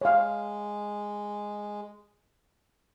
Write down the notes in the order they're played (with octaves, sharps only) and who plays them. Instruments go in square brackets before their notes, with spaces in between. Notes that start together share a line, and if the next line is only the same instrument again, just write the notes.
[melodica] G#3 [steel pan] C#5 F5